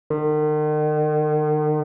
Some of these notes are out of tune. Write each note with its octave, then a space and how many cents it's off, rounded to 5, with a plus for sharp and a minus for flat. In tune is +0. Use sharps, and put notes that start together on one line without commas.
D#3 -40